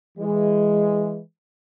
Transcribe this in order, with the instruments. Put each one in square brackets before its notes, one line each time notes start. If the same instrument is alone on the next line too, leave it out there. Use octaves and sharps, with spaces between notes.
[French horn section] E3 G#3